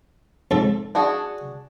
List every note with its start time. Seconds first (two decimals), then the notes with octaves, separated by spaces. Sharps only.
0.51 F2 G#2 A4
0.95 D4 F#4 G#4